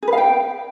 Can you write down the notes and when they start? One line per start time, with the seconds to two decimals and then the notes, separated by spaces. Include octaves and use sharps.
0.03 G#4
0.08 B4
0.13 F5
0.18 G5